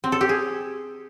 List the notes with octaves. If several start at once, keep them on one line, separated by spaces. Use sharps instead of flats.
C4
A4
G4
G#4